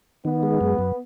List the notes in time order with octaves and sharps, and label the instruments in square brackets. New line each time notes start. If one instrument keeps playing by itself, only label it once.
[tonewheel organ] D#3 [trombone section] B3
[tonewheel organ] G#3
F#2
F#2